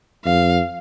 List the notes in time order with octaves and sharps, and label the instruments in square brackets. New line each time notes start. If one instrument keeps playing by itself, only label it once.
[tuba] F2 [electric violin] F5